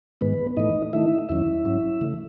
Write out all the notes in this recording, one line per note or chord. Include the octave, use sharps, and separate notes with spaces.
G#2 D#3 G#3 B3 B4
A2 E3 A3 D#4 D#5
D#3 A3 D#4 E4 E5
E2 D#3 F#3 C#4 E4 E5
G#2 F#3 C#4
C#3 E3 A3